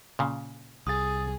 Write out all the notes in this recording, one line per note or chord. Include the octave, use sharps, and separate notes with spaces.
A#2 C#3
C2 G#4 D#6 A6